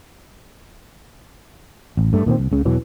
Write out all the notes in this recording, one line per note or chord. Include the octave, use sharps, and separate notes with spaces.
A1
G2 A3
A#2 D#3 A3 C4
C2
C#2 C#3
E2 B2 E3 F#3